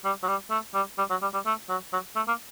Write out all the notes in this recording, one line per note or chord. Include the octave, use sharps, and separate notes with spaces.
G3
F#3
G3
A3
G3
G3
F#3
G3
G3
A3
F#3
F#3
A3
A#3